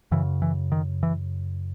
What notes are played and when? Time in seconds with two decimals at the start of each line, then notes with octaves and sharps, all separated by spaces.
0.11 F#2 C#3 E3
0.42 E3
0.72 D#3
1.03 E3